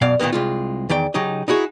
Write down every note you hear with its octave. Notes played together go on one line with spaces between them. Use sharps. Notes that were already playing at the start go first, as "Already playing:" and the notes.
F#2 B2 D5 F5
A#2 D#3 E3 A#3 B3
C2 G#3 F4
E2 D#3 D5 G5
C#3 F#3 D#4 G4 D#5
D#4 E4 F#4 G#4